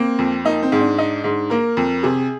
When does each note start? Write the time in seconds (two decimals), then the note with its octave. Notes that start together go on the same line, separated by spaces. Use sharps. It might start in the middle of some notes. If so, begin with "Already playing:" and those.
Already playing: A#3 C4
0.18 F2
0.45 A#3 D#4
0.62 C4
0.72 G#2
0.80 D4
0.98 D#4
1.24 G#2
1.50 A#3 A#4
1.77 F2
2.03 C3 G#4